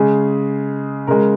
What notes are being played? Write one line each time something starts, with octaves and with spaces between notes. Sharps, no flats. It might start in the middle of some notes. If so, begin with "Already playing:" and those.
Already playing: C#3 G#3 G#4
C#3 G#3 A#4